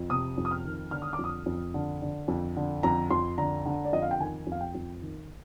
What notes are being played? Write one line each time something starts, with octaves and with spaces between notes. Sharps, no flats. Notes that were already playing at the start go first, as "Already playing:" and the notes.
Already playing: F2
C3 D#6
F2
D#6
F6
D#3
D3 F6
D#6
D6
F2
D#6
F2
D3
D3
F2
D3
F2 A#5
F2 C6
D3 A#5
D3
D5
F2 D#5
F5
G5
D#3 G#5
F2
F5
G5
F2
D#3